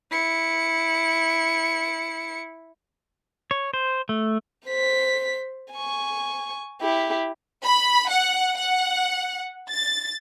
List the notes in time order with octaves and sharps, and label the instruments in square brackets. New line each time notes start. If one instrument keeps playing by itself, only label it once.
[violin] E4 C#7
[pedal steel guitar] C#5
C5
A3
[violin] C5 B6
G#5 C#6
E4 G4
[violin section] B5
F#5
F#5
A6